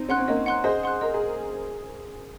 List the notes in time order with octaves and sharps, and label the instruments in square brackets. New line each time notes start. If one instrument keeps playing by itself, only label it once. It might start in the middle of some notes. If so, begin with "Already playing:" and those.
Already playing: [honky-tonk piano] C4 D#4
[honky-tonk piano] C#4 [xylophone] F#5 C6 F#6
[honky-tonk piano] C4
[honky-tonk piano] A#3 C#4 [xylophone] D#5
[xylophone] F#5 C6 F#6
[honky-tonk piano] G#4 C5 [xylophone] D#5
[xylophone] F#5 C6 F#6
[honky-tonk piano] A#4 [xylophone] D#5
[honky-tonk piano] G#4